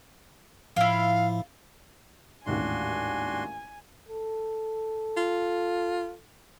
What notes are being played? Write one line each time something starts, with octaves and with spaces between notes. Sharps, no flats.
A2 F3 E4 F4 F5
A1 D#2 G#2 D4 F#4 G#5 C6
A4
F4